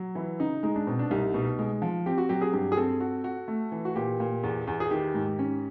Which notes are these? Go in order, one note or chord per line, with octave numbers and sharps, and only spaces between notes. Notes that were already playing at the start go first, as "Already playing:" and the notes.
Already playing: F#3
E3 E4
C#3 D#4
G#3 D#4
D4
B2 C4
D4
C2 D#4
B2
G#3
F3
C4 G4
F#4
F#3 G4
G#4
G2 G4
G#4
C4 A4
F#4
F#4
A3
E3
F#4
A#2 G4
A#2
E2
E2
G#4
D#3 G4
G#2
C#4